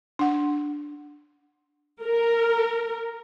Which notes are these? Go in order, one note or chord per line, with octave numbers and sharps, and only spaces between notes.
D4 F#5
A#4